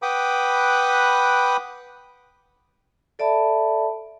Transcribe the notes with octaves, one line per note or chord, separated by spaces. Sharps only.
B4 F#5 G5 B5 D6 D#6
A4 D5 E5 A5 B5